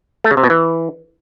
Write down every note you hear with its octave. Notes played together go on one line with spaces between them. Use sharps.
A3
C#3
C3
B2
E3